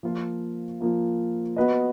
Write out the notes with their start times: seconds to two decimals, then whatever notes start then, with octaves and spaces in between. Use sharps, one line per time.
0.03 F3 A#3 F4
0.80 F3 A#3 F4
1.56 B3 F#4 B4 D#5